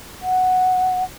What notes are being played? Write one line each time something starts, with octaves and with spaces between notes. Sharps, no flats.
F#5